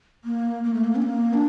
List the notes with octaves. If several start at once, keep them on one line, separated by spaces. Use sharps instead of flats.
A#3
A#3
A3
A#3
C#4
A#3
D4